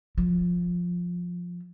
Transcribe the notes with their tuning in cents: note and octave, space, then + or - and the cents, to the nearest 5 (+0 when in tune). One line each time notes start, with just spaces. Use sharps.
F3 +10